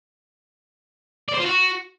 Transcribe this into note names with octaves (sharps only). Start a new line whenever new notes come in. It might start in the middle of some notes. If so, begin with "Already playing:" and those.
D5
C5
F4
F#4